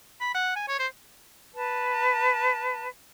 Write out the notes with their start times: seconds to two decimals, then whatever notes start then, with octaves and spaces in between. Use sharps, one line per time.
0.21 B5
0.34 F#5
0.56 G#5
0.68 C#5
0.79 C5
1.55 B4 A5